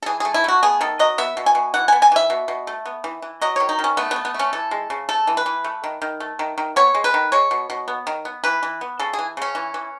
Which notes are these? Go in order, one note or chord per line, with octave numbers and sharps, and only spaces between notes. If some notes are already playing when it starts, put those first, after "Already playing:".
A4
E3 G#4
A3 G#4
E4
A3 F#4
B3 G#4
D#3 A4
F#3 D#5
B3 E5
B2
G#5
B2
E3 F#5
B3 G#5
G#5
E3 E5
B2
B2
A3
B3
E3
E3
F#3 D#5
D#3 C#5
D#4
D#3
C#4
A3 B3
B3
A3
B3
A3 C#4
E3 A4
G#3
C#3
A3 A4
E3
B4
E3
A3
D#3
D#3
A3
D#3
D#3
B3 C#5
G#3
B4
D#3
G#3 C#5
B2
B2
B3
D#3
B3
E3 B4
E3
B3
C#3 A4
G#4
E3
C#3 C#4
E3
E3